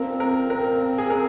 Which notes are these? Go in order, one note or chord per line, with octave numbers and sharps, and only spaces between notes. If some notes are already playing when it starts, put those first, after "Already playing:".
Already playing: A#2 F3 C4 A#4
A#4
A#2 F3 C4 A#4
G#4
A#2 F3 C4 A#4